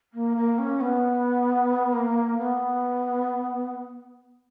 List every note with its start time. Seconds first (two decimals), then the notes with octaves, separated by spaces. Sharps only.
0.13 A#3
0.36 A#3
0.58 C#4
0.80 B3
1.92 A#3
2.37 B3